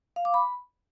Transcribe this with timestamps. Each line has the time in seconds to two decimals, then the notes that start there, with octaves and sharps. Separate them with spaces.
0.16 F5
0.25 D6
0.34 B5